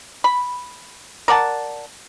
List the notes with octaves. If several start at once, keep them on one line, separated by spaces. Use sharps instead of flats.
B5
A#4 D5 F#5 A5